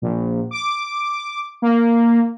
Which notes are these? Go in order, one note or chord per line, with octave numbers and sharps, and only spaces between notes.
A#1
D6
A#3